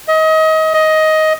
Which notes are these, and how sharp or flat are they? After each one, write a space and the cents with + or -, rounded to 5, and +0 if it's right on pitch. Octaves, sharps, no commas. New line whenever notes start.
D#5 +30
D#5 +15